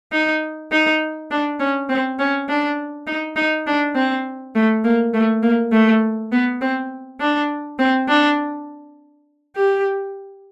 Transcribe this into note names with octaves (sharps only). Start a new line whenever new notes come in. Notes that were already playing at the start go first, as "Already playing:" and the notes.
D#4
D#4
D4
C#4
C4
C#4
D4
D#4
D#4
D4
C4
A3
A#3
A3
A#3
A3
B3
C4
D4
C4
D4
G4